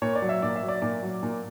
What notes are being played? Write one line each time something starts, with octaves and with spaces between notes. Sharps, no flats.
A#2 C#5
D5
F#3
E5
A#2 D5
E5
F#3
D5
A#2 D5
F#3
A#2